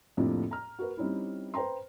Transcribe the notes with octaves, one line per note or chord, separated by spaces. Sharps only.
F2 A2 C3 A#3 D4 F4
A#5 F6
F#4 A#4 B4
G3 C4 C#4 D#4 E4
B4 C5 G5 A#5 C6